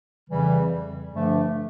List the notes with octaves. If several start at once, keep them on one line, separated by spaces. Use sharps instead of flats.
F2 C#3 E3 G3
G2 D3 F3 A3 D4